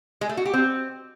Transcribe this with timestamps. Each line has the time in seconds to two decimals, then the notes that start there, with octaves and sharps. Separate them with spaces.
0.21 G#3
0.29 A3
0.37 F#4
0.45 G4
0.54 C4